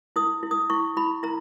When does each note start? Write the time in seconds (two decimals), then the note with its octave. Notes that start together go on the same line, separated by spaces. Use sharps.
0.16 E4 D#6
0.43 E4
0.51 D#6
0.70 E4 C#6
0.97 E4 B5
1.23 E4 A#5